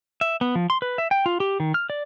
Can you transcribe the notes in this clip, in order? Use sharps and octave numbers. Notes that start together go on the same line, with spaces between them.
E5
B3
F3
C6
B4
E5
G5
F4
G4
D#3
F6
D5